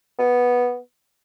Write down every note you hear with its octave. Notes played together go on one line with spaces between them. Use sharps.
B3